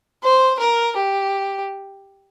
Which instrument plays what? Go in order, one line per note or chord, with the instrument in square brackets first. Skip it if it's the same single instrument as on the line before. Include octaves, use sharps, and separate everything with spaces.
[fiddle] C5
A#4
G4